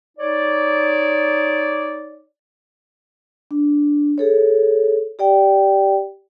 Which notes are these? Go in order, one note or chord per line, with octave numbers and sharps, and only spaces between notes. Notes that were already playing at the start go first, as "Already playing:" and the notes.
D#4 C#5 D5
D4
G#4 A4 C#5
G4 D5 G5